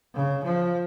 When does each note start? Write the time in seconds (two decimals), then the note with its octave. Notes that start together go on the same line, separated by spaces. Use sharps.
0.14 C#3
0.44 F3